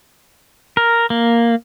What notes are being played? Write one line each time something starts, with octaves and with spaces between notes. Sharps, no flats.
A#4
A#3